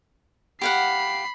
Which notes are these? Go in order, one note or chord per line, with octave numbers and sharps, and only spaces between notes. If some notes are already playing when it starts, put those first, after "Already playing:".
G4 F5 F#5 B5 C7